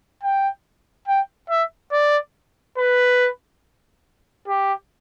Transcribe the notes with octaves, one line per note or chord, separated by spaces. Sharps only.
G5
G5
E5
D5
B4
G4